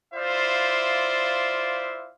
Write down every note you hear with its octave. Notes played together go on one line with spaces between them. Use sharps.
E4 F4 C5 D5 E5 F5